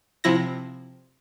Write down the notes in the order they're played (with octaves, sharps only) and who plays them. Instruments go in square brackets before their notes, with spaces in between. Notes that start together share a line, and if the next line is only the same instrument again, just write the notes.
[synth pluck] C3 F3 E4 A#6